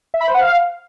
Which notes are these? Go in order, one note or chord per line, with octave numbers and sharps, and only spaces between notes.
E5
B5
C5
F#5
F5